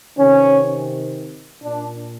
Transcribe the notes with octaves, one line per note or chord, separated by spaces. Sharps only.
C3 D#3 C#4
A#2 D4